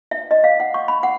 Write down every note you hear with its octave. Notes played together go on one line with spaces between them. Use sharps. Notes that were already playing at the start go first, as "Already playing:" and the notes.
E5
D#5
F5
F#5
C#6
B5
F#5